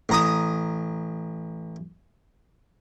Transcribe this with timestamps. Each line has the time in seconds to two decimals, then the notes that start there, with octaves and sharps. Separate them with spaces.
0.09 A1 A#5 D#6